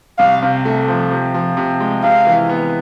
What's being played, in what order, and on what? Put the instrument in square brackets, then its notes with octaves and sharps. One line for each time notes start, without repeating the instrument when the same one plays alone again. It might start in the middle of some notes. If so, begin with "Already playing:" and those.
[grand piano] C2 [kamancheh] F5
[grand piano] C3
A3
F3
C3
F3
C3
G#3
[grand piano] C3 [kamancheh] F5
[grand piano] E3
B3